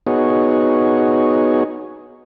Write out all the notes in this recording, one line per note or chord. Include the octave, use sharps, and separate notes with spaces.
B3 D#4 F#4 G#4 C#5